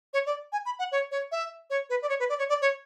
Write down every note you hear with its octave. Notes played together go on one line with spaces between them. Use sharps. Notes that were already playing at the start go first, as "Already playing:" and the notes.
C#5
D5
G#5
B5
F#5
C#5
C#5
E5
C#5
B4
D5
C#5
B4
D5
C#5
D5
C#5